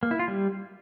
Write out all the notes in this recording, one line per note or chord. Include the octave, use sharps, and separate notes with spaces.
A#3
E4
F4
G3